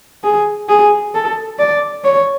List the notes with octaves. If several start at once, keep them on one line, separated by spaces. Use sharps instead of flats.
G#4
G#4
A4
D5
C#5